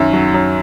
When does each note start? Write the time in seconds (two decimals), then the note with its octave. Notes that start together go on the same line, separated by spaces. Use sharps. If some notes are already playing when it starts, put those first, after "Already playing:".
Already playing: F#2 D#3 E5
0.13 F#3
0.34 F#2